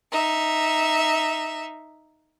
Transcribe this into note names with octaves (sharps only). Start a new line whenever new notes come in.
D#4 E5